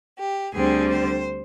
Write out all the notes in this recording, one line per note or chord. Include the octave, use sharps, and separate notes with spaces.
G4
D2 D3 G3 C4 G#4
C5